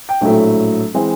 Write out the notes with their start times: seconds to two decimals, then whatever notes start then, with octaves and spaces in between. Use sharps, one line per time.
0.09 G5
0.21 A#1 A2 F#3 A3
0.94 E3 G#3 C4